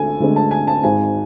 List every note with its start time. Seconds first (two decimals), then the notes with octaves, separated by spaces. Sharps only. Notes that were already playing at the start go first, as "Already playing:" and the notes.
Already playing: D2 D3 G#3 A4 G#5
0.20 D2 D3 G#3
0.36 A5
0.51 G#5
0.67 A5
0.83 G#1 G#2 G#3 G#5